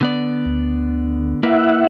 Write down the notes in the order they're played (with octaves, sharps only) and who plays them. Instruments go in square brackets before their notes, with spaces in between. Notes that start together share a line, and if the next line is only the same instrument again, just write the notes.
[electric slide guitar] D3 B3 D5
[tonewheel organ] D2
[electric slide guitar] A#3 B4 [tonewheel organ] E4 E5 F#5